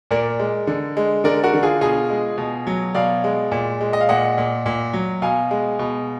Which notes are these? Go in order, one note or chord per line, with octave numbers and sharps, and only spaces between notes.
A#2 A#4 D5
G#3
D3
G#3
D3 A#4 D5
F#4 A#4
D3
F4 G#4
B2 F4 G#4
G#3
B2
F#3
B2 D5 F5
G#3
A#2
G#3
D#5
F5
A#2 D#5 F#5
A#2
A#2
F#3
B2 F5 G#5
G#3
B2